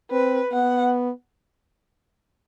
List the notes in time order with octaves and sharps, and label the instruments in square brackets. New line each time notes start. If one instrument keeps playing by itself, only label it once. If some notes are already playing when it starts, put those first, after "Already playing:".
[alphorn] C4 [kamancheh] B4
[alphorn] B3 [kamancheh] F#5